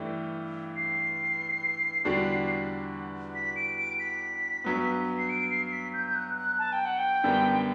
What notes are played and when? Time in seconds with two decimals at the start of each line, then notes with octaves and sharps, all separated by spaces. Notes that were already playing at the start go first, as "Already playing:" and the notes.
Already playing: G2 E3 A3 D4 G4
0.76 C7
2.05 E2 D3 G3 D4 F#4
3.35 B6
3.56 D7
3.78 D7
3.99 B6
4.64 G2 F#3 B3
5.18 C7
5.29 D7
5.50 C7
5.66 C7
5.72 B6
5.93 G6
6.06 G6
6.15 F#6
6.37 F#6
6.59 A5
6.72 G5
6.85 F#5
6.98 G5
7.24 F#2 D3 G3 B3